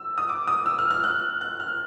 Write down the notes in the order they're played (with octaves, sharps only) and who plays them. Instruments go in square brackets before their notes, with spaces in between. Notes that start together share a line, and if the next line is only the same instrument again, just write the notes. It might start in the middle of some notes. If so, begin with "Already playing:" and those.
Already playing: [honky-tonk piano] E6
D#6
D6
D#6
E6
F6
F6
F#6
F#6
F6